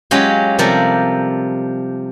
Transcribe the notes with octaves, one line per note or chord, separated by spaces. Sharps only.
F#3 G#3 C#4 F4 G4
C3 F3 G3 A4 A#4